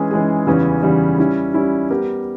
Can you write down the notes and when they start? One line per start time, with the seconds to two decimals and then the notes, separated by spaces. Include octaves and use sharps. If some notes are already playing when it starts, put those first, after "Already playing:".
Already playing: E3 G#3 C#4 G#4
0.11 E3 G#3 C#4 G#4
0.47 E2 C#3 E3 G3 C#4
0.82 E2 C#3 E3 G3 C#4
1.18 G3 C#4 E4
1.54 G3 C#4 E4
1.90 G3 B3 G4 A#4